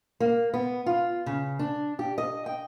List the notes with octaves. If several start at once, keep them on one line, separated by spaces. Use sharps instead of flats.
A#3
B3
F4
C#3
D4
G4
D#5
G5